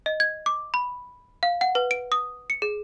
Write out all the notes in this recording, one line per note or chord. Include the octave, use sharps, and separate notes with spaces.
D#5
G#6
D6
B5
F5
F#5
B4
D7
D#6
C#7
G#4